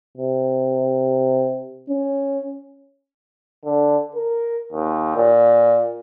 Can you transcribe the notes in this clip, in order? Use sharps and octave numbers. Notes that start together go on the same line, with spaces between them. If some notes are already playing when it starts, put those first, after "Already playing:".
C3
C#4
D3
A#4
D#2
A#2